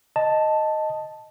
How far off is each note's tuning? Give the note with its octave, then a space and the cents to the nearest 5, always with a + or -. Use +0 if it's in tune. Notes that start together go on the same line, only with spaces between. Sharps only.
D#5 +0 A5 +0